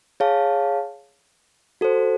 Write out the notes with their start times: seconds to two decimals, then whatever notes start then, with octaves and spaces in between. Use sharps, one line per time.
0.20 G#4 C#5 F5 A5
1.81 F#4 A4 C5